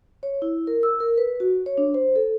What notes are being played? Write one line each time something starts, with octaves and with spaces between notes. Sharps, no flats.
C#5
E4
A#4
E6
A#4
B4
F#4
C#5
D4
C5
A4